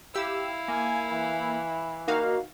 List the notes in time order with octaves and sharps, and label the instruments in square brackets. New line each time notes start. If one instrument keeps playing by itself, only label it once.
[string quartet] E4 F5 [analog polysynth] G4 E6
[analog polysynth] A#3 [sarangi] G#5
[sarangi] E3
[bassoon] A#3 [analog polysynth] D#4 F#4 F5